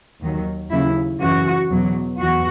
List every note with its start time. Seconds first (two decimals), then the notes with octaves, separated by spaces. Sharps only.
0.21 D#2 D#3 F#3
0.70 D#2 C#3 F#3 E4
1.20 F#2 C#3 E3 F#4
1.70 E2 B2 F#3
2.20 E2 F#4